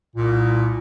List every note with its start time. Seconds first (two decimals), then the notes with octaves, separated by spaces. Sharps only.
0.16 C2 A#2